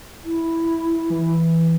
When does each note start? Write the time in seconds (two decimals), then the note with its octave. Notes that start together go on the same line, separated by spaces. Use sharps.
0.24 E4
1.10 E3